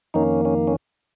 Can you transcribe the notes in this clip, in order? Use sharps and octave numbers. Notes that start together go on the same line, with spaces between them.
F2 D#3 A#3 C#4 D#4
C#4
C#4